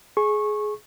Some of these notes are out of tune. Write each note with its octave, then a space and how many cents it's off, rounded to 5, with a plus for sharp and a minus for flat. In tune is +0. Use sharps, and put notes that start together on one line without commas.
G#4 +20 C#6 -20